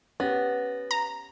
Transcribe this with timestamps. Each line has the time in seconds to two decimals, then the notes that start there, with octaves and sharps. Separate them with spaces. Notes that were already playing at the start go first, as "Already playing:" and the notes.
0.20 B3 C#4 G4 B4 A6 A#6
0.91 A#5